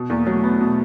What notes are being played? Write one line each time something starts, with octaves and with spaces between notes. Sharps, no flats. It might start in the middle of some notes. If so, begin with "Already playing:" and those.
Already playing: B2
E2 A#3
F#3 A3
B3
B2